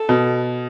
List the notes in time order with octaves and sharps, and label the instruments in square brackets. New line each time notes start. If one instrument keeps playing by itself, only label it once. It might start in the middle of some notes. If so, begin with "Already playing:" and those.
Already playing: [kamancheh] A4
[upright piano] B2